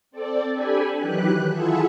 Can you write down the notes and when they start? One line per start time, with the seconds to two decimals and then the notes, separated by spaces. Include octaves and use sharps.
0.11 C4 A4 D5
0.54 D4 G4 A4 G#5 B5
0.98 D#3 E3 F#3 G4 B4 F#6
1.49 E4 F4 G#4 A4 E5 F#5